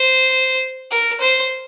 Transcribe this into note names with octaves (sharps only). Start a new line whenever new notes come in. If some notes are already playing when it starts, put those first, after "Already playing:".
Already playing: C5
A#4
C5